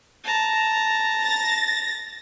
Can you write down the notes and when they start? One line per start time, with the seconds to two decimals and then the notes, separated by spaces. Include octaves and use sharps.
0.24 A5 A#5
1.23 A6 A#6